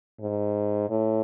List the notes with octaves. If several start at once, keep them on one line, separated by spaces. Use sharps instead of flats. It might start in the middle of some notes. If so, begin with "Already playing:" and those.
G#2
A2